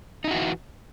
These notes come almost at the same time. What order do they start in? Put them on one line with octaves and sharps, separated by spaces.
D#4 E4 F#4 E3